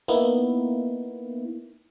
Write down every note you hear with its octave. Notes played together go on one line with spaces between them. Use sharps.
A#3 B3 D#4 E4